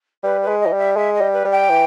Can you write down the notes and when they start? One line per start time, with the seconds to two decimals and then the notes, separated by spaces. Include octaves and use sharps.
0.23 G3 B4
0.42 B4
0.48 G#3
0.60 D#5
0.66 E3
0.72 G3
0.78 E5
0.96 G#3 E5
1.14 D#5
1.21 G3
1.33 B4
1.45 G3
1.51 G5
1.69 E3